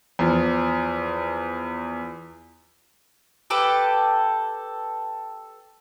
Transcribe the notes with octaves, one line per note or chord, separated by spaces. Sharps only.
E2 F3
G4 A4 B4 G5